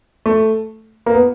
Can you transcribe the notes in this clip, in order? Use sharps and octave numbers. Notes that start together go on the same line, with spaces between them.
A3
A#3
B3